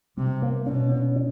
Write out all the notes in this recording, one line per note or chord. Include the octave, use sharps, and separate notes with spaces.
C3 G3
A#3
B2 C#4
C#4
C#4